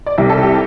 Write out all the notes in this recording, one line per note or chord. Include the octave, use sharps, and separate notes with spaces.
D5
C2 C3 G3 E5
A4
G4